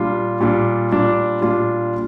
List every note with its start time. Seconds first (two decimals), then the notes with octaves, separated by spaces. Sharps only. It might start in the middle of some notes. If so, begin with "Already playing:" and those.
Already playing: A#2 G3 D4 F4
0.40 A#2 G3 D4 F4
0.91 A#2 G3 D4 F4
1.41 A#2 G3 D4 F4